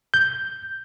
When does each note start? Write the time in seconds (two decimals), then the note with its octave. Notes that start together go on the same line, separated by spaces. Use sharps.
0.14 G6